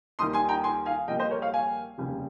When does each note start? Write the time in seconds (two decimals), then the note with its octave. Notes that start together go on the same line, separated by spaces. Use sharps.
0.19 D#2 D#3 G3 A#3 C6 D#6
0.33 G#5 C6
0.49 G5 A#5
0.64 G#5 C6
0.86 F5 G#5
1.08 A#1 A#2 G3 A#3 D#5 G5
1.19 C5 D#5
1.31 A#4 C#5
1.42 C#5 F5
1.53 F5 G#5
1.98 F1 D#2 C#3 G3